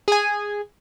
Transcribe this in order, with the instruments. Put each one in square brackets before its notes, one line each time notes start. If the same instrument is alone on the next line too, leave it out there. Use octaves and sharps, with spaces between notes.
[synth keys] G#4 G#5